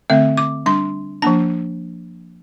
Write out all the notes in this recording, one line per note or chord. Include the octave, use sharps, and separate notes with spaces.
D3 A3 C4 E5
D6
G3 D4 C6
F3 A#3 D4 A5